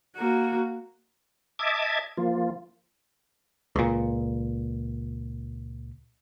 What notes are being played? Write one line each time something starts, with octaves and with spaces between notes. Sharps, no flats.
A#3 F#4
D#5 E5 A5 D6 G#6
F3 A#3 F4
C#2 A#2